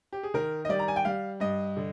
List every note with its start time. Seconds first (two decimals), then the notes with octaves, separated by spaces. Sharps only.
0.13 G4
0.23 G#4
0.34 D#3 A#4
0.65 D#5
0.69 G3 D5
0.79 A#5
0.88 G#5
0.96 G5
1.05 G3 F5
1.40 G2 D#5
1.77 D3